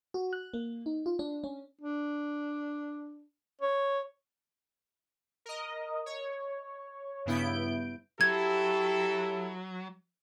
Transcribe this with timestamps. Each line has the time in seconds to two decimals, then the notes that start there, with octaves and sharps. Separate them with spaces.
0.14 F#4
0.33 F#6
0.54 A#3
0.86 D#4
1.06 F4
1.19 D4
1.44 C#4
1.81 D4
3.62 C#5
5.46 A#4 D#5
6.06 C#5
7.26 G2 C#3 B3 E4 G6 D7
8.21 F#3 E4 G4 A4 G#6